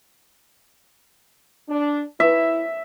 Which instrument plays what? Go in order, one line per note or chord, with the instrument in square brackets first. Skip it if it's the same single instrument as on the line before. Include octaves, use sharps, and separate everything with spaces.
[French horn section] D4
[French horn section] E4 [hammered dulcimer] E5